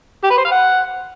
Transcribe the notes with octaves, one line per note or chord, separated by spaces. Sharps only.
G4
B4
C5
F5
F#5